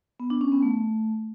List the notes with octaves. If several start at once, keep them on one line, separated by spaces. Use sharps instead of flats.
B3
D4
C#4
B3
A3